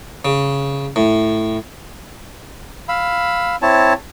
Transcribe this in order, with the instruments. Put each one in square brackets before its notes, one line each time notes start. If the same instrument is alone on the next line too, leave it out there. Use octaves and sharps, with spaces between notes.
[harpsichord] C#3
A2
[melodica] F5 B5 E6
C4 E4 C#5 A5